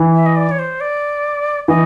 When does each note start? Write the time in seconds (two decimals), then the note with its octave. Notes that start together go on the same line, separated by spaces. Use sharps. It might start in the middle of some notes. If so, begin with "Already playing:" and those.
Already playing: E3
0.15 E5
0.26 D#5
0.36 D5
0.51 C#5
0.59 C5
0.81 D5
1.68 E3 D#5